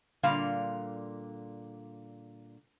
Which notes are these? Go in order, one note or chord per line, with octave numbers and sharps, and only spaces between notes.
A#2 D3 G3 F5